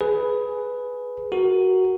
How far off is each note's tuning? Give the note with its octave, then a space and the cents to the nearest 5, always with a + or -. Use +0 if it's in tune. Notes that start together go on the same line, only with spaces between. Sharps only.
G#4 +15 B4 +0
F#4 +10 A#4 -10